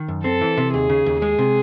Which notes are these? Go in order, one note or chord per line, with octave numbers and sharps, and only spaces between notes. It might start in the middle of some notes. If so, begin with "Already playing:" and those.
Already playing: D#3
F#2
C4 A4
E3
C3
D#2 G#4
C#3
D#2
G#3 G#4
C3